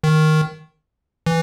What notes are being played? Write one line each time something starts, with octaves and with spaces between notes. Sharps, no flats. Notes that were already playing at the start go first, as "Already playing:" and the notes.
D#3
E3